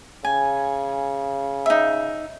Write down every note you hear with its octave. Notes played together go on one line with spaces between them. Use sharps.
C#3 G#5
D#4 E5